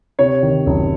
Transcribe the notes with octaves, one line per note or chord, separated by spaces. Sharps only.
C3 C#5
D#3
F#1